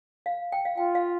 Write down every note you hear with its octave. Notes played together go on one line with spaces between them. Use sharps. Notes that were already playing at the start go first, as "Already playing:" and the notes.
F5
G5
F5
F4 G5
F5